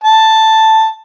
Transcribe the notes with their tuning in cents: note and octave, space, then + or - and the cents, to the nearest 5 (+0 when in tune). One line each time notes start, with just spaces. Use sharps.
A5 +5